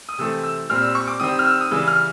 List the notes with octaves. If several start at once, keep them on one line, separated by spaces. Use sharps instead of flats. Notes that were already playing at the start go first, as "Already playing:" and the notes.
D#6
C3 E3 A3 C4 E6
E6
A#2 G3 C4 F6
E6
C#6
D6
D#3 G3 C4 D#6
F6
E6
D#6
C#3 E3 G3 E6
F6